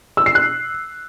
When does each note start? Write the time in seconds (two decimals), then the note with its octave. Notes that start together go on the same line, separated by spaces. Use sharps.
0.17 E6
0.26 C7
0.35 F#6